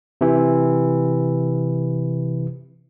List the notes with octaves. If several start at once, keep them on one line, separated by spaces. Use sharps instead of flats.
C3 E3